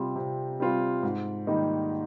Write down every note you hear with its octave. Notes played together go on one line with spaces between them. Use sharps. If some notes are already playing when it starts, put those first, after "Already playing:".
Already playing: C3 G3 C4 F4
C3
G3 C4 F4
G#2
D#3 G3 A#3 D#4